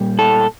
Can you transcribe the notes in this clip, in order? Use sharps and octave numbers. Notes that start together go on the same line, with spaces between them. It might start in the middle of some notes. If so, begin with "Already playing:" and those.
Already playing: A#2 G3
A4